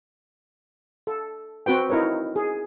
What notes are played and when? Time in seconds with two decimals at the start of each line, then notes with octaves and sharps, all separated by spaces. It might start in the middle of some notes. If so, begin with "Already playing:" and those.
1.07 A4
1.66 C4 F#4 B4 G5
1.90 D#4 E4 A#4 B4 C#5
2.36 G#4